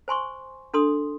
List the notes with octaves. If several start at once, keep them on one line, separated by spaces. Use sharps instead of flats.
C5 G#5 C6 C#6
D4 A4 C6 D#6